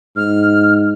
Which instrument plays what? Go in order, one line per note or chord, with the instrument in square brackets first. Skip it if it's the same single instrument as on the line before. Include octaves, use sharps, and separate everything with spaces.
[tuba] G#2 [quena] F6